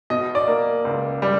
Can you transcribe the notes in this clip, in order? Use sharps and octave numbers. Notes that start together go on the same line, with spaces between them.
B2 D#5
D5
A#3
C#2
G3